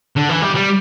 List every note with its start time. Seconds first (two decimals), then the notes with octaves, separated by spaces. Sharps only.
0.17 D3
0.30 E3
0.42 G3
0.55 G3